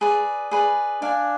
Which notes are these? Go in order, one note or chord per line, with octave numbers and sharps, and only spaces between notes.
G#4 B4 D5
G#4 B4 D5
D4 D5 F5 G#5